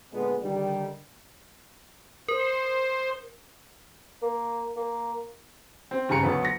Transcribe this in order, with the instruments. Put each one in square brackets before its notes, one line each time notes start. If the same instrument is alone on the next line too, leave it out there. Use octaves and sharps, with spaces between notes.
[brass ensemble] A#2 D3 G#3 B3
D3 D#3 G3
[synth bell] A#4 [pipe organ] C5
[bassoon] A#3
A#3
[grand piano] C4
G2 C#3 G#5 A#5 C#7
D2 F#3 B3
A#6